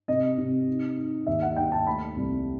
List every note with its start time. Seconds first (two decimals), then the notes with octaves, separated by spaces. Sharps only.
0.08 C3 D#5
0.38 C3
0.67 D#4
0.97 D#4
1.27 D#2 E5
1.42 F#5
1.56 D#2 G5
1.72 A5
1.87 A3 B5
2.16 C2